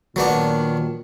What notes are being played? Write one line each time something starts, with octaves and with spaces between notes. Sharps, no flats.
A#2 D#3 F#3 B3 D4